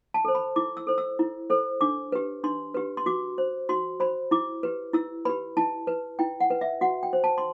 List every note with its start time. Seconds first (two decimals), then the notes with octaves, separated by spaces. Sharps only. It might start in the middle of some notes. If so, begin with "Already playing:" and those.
0.14 A5
0.25 A4 C5
0.35 B5
0.56 E4 D6
0.77 E6
0.87 A4 C5
0.98 E6
1.19 E4
1.50 A4 C5
1.81 D4 D6
2.12 G4 B4
2.44 D4 C6
2.74 G4 B4
2.97 C6
3.06 F#4 D6
3.38 C5
3.69 F#4 C6
4.00 C5 B5
4.31 E4 D6
4.63 G4 B4
4.93 E4 E6
5.25 G4 B4 B5
5.57 E4 A5
5.87 B4
6.19 E4 G5
6.40 F#5
6.50 B4
6.61 E5
6.81 F#4 F#5
7.03 G5
7.13 C5
7.24 A5
7.38 C6